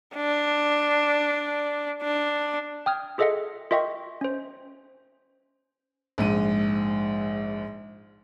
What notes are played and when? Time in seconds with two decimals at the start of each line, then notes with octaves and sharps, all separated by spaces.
0.16 D4
2.02 D4
2.86 G5 D#6 F6 G#6
3.18 F4 G#4 A4 D#5 E5 F#5
3.71 F4 A#4 D#5 E5 G5 C#6
4.21 C#4 C5
6.18 A#1 G#2 D#7